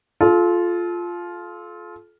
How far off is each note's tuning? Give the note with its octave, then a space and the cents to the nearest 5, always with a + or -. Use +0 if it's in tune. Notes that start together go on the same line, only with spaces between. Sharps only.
F4 +0 A4 -35